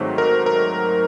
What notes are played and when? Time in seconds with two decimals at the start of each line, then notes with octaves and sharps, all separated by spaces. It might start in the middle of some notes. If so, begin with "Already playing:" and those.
Already playing: G#2 D#3 F#3 A3 C4
0.18 A#4
0.46 A#4